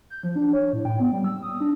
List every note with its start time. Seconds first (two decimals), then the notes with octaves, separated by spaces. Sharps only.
0.10 G6
0.23 F3
0.36 D4
0.53 C#5
0.73 A2
0.85 G5
1.00 B3
1.12 G3
1.24 E6
1.43 D#6
1.60 D4